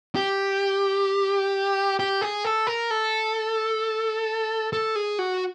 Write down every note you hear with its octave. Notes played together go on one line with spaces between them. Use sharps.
G4
G4
G#4
A4
A#4
A4
A4
G#4
F#4